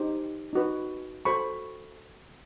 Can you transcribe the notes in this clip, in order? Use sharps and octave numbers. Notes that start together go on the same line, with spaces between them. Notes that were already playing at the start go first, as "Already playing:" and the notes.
Already playing: D#4 G4 C5
D#4 F#4 B4
F#4 A4 C5 B5 C#6